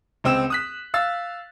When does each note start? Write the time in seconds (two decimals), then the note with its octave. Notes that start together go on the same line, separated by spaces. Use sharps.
0.24 C#2 C4 E6 E7
0.50 D#6 F#6 B6
0.94 F5 E6 A6